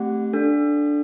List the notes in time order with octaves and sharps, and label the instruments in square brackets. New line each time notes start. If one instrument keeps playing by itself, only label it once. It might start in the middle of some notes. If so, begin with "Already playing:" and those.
Already playing: [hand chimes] A3 C4 G4 F#5
D4 A4